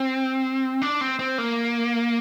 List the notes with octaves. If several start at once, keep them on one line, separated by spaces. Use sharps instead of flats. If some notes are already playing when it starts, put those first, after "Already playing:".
Already playing: C4
D4
C4
C4
A#3